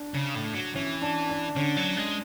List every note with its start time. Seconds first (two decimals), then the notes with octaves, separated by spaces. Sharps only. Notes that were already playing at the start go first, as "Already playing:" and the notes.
Already playing: D4
0.14 C#3
0.35 A2
0.54 F#3
0.75 E3 C#4
1.02 D4
1.29 D4
1.56 D3 C#4
1.77 F#3
1.96 G#3